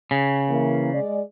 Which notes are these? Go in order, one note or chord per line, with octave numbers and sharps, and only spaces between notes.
C#3
E3 A#3
G#3 D5